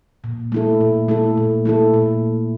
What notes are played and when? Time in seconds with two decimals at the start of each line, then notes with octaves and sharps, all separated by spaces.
0.24 A#2
0.52 A3 E4 A4
0.81 A#2
1.08 A3 E4 A4
1.37 A#2
1.65 A3 E4 A4
1.94 A#2